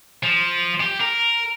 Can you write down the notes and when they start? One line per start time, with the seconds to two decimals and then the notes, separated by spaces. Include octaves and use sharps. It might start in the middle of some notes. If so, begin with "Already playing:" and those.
0.23 F3
0.80 G4
1.00 A#4